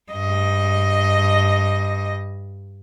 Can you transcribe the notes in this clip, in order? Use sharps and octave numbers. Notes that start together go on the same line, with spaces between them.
G2 D#5